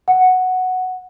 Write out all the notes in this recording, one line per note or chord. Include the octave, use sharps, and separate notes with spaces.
F#5